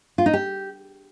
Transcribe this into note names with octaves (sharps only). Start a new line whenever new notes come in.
F4
D#4
G4